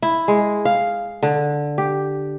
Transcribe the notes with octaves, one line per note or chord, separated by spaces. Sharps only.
E4
G#3
F5
D3
G4